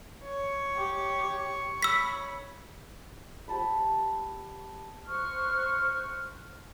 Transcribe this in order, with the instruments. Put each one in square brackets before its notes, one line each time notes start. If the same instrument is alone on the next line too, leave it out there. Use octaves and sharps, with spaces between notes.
[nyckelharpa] C#5
[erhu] G4
[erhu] B5 [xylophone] E6 B6
[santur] G4 C5 A5 B5
[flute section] C5 C#6 F6 F#6